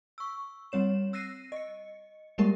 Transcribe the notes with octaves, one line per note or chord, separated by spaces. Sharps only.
C#6 E6
G3 C4 C#5 E7
E6 F#6 A#6 C7 D#7
D#5 C#7
G3 G#3 A#3 G4 A#4